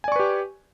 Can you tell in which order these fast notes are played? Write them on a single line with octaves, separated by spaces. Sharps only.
G#5 D5 C#6 B4 G4